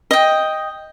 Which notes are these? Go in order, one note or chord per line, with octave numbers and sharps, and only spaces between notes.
D#5 G5